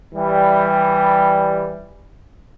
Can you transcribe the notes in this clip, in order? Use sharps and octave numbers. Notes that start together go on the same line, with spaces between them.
E3 G3